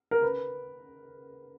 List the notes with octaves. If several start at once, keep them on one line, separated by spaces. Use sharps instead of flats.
A#4
B4